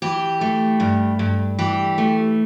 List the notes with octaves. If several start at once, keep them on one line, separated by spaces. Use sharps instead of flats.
E3 G4
A3
G2
G2
E3 G4
A3